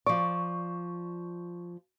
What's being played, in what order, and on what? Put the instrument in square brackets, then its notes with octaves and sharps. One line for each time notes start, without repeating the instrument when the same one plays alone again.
[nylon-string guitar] F3 D5 [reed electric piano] C#6